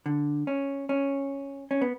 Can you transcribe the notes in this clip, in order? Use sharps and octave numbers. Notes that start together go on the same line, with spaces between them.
D3
C#4
C#4
C#4
B3